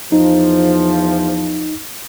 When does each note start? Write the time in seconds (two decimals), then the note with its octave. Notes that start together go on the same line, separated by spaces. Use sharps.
0.12 E2 F3 D#4